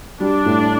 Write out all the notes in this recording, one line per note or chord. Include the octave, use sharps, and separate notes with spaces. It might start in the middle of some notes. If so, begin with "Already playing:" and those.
G3 D4
A2